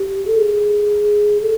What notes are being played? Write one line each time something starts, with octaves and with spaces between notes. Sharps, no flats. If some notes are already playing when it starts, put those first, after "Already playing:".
Already playing: G4
A4
G#4
A4